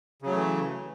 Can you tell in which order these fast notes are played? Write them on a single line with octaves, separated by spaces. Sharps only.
C#3 F#3 A3 E3